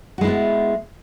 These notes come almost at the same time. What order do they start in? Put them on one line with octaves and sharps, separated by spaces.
F#4 G#3 E4 B3